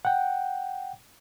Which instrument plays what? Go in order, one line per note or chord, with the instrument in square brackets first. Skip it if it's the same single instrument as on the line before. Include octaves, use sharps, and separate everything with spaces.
[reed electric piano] F#5 G5